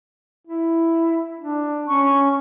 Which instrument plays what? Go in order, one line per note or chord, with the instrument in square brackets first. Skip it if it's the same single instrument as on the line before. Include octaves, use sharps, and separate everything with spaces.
[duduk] E4
D4
[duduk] C#4 [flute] C#6